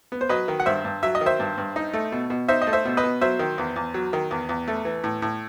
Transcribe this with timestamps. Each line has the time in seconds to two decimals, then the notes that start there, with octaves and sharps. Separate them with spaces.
0.12 B3
0.21 C5
0.29 F#3 B4 D#5
0.48 D#3
0.60 F#5
0.66 G2 C5 E5
0.85 G2
1.03 F#3 E5
1.15 D#5
1.21 D#3
1.26 C5 E5
1.40 G2
1.58 G2
1.76 D#4
1.94 A3
2.12 B2
2.30 B2
2.48 D#4 C5 E5
2.62 D#5
2.67 A3
2.73 C5 E5
2.85 B2
2.97 B4 D#5
3.03 B2
3.21 F#3 C5 E5
3.39 D#3
3.58 E2
3.76 E2
3.94 F#3
4.13 D#3
4.31 E2
4.49 E2
4.68 A3
4.85 E3
5.04 A2
5.22 A2